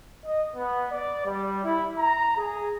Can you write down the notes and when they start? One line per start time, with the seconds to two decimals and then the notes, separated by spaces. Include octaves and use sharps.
0.25 D#5
0.56 B3
0.91 D5
1.26 G3
1.64 E4
1.99 A#5
2.36 G#4